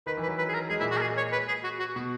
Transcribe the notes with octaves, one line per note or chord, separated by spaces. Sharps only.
D#3 B4
E3
B4
F#3
B4
G#4
A#4
G#3 G#4
A#2 E4
F#4
A#4
G#4
C#5
B4
G#4
F#4
F#4
B2 F#4